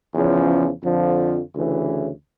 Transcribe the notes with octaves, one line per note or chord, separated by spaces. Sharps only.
E2 C#3 F3 C#4
F2 D3 F3
D2 C#3 E3